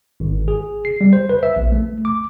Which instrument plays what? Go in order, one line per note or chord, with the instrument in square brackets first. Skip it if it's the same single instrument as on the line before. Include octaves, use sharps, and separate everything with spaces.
[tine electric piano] G#1
G#4
C7
G3
C5
B4
E5
A#1
A3
D6